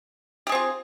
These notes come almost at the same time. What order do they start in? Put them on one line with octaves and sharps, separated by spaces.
G4 G#4 C4 F4